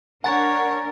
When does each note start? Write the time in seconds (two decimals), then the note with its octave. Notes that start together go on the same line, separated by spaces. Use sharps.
0.24 D4 A#4 C#5 F#5 G#5 A#5 A6